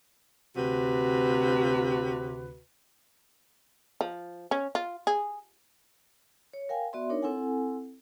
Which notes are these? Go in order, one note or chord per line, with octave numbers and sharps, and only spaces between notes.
D2 C3 F#4 B4
F3
C#4
F4
G#4
C#5
A#4 F5 G5 G#5
B3 F#4 D5 E5 C6
D4 D#4 A#4 C#5
C4 E4 A4 F#5 G#5